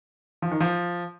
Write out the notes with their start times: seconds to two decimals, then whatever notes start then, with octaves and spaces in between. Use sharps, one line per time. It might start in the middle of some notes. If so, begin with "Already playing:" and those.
0.42 F3
0.51 D#3
0.60 F3